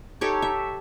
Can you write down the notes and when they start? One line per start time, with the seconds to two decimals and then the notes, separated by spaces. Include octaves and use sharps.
0.21 D#4 G4 A4 C#5
0.42 E5